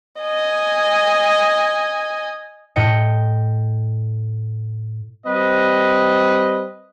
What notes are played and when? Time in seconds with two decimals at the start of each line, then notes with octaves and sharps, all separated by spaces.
0.22 D#5 G#5
2.76 A2 D#5 G5 C#7
5.26 G3 C4 B4 D#5